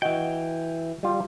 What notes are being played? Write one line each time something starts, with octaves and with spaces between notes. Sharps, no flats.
E3 F#4 D#5 G5
G3 F4